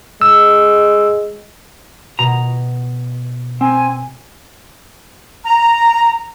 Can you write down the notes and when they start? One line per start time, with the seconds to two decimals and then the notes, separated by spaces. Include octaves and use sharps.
0.22 G#3 E6
2.19 B2 A#5
3.61 C4 G#5
5.45 A#5